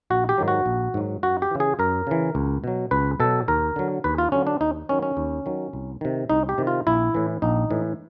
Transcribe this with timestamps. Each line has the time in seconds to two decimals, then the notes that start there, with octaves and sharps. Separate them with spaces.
0.10 A#1 F#4
0.29 G4
0.38 G#2 D#3 F#3
0.48 F#4
0.66 A#1
0.94 G#2 D#3 F#3
1.23 F#2 F#4
1.42 G4
1.51 C#3 E3
1.60 G#4
1.79 F#2 A#4
2.07 C#3 E3
2.35 C#2
2.64 B2 F#3
2.91 C#2 B4
3.20 B2 F#3 A4
3.48 D#2 A#4
3.76 D3 F#3
4.04 D#2 B4
4.18 F4
4.32 D3 F#3 C#4
4.47 D4
4.61 D#2 D#4
4.89 D#3 F#3 C#4
5.03 C#4
5.17 D#2
5.46 D#3 F#3
5.73 C2
6.01 C3 D#3
6.30 C2 D#4
6.49 G4
6.58 C3 D#3
6.67 F4
6.87 A#1 E4
7.15 A2 E3
7.42 A#1 D#4
7.70 A2 E3